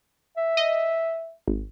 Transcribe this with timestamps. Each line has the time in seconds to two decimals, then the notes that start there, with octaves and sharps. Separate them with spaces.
0.37 E5
0.57 D#5
1.48 G#1